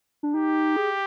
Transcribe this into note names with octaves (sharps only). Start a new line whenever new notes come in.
D4
D#4 G4
G#4